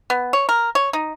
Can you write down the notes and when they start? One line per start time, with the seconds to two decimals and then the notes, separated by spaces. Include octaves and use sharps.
0.10 B3
0.33 C#5
0.49 A#4
0.75 C#5
0.93 D#4